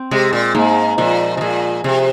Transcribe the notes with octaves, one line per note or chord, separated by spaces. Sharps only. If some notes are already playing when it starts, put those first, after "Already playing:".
Already playing: C4
C3 G#3
A#2
G#2 A#3
A#2 F3
C3
A#2 G#4
C3 G#4